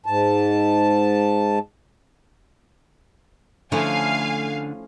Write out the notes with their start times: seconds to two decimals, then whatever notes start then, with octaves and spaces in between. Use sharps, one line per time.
0.06 G#2 A5
3.72 D3 F3 A3 C#4 E4 F5 G#5